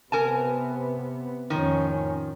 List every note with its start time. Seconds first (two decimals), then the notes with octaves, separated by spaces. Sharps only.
0.12 C3 B3 A#4 G#5 A5
1.50 F2 A2 D#3 F3 C#4